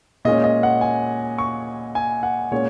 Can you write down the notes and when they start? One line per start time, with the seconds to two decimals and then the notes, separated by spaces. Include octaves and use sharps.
0.25 A#2 G#3 C#4 D#5
0.44 D#5
0.63 F#5
0.81 G#5
1.38 C#6
1.95 G#5
2.23 F#5
2.51 A#2 G#3 C#4 C#5